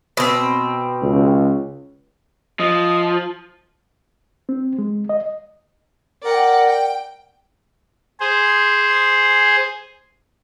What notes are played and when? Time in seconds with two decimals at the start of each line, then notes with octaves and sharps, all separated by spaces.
0.17 B2 C4
1.03 C#2
2.60 F3 D#5
4.49 C4
4.78 G#3
5.09 D#5
6.24 A#4 D5 F#5 G5
6.64 G5
8.20 G#4 C5